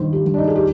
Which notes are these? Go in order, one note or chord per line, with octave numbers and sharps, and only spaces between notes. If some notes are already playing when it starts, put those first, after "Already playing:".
Already playing: G2 D#3 C5
G4
G2
D4
D#4
G#4
G4